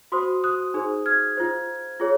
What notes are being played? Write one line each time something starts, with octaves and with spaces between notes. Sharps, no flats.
F#4 C5 C6 D#6
D#6 F#6
D#4 G#4 C5
F6 G#6
F4 C5
F4 G#4 C#5